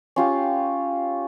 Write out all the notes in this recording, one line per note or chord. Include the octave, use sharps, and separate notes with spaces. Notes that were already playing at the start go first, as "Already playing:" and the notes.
C#4 F4 G4